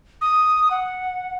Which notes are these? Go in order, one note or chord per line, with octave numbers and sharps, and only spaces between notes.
D#6
F#5